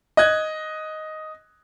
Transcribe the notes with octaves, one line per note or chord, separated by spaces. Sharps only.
D#5 F#6 G#6